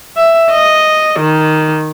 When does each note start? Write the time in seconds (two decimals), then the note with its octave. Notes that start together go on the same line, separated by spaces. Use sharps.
0.16 E5
0.51 D#5
1.20 D#3